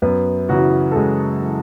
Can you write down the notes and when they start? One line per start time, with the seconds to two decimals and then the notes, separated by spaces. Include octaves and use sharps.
0.02 F#2 B3 B4
0.49 C#3 E3 F#3 F#4
0.92 A4
0.96 F#2 G#3 G#4
1.42 E3